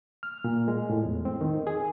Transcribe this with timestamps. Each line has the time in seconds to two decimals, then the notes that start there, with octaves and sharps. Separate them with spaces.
0.23 F6
0.44 A#2
0.68 G#3
0.90 A2
1.05 E2
1.25 C4
1.41 D#3
1.67 G#4